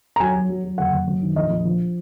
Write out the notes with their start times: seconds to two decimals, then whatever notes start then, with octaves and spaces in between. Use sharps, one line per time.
0.16 A#5
0.20 F#3 G#5
0.35 F#3
0.49 F#3
0.64 F#3
0.78 F#1 F#5
0.92 F#1
1.07 F#2
1.22 D#3
1.36 A#1 D#5
1.51 A#1
1.65 F3